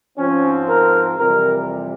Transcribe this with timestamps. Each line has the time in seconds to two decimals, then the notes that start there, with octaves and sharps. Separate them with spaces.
0.18 G#2 F3 C4 C#4
0.68 A#4
1.18 F2 C3 E3 G3 A#4